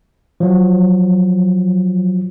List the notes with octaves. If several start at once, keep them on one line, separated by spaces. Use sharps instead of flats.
F3 F#3